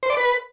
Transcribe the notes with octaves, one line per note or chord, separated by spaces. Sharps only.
C5
D5
B4